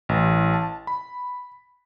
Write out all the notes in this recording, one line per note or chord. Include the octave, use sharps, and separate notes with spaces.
A1
A5
B5